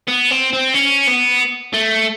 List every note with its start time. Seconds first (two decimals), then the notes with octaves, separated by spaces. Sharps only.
0.08 B3
0.31 C4
0.53 C4
0.74 C#4
1.07 B3
1.74 A3